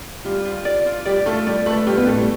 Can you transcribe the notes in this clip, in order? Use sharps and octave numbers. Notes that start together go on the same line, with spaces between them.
G3 F4 G4
F4
D5
F4
G3 G4 D5
A3 F4 A4
G3 G4 D5
A3 A4 B4
G3 F4 G4
B2 B3
A2 A3 A4
G3